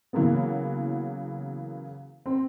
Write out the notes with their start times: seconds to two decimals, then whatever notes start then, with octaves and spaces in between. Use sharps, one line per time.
0.13 C#3 E3 F#3 A#3 B3
2.26 C4